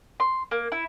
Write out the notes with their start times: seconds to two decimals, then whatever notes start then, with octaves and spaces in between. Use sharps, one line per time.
0.20 C6
0.51 A#3
0.72 E4